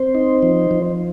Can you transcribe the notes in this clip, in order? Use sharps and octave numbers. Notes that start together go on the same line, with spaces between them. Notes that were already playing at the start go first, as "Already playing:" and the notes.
Already playing: C4 C5
D#4
F3
F3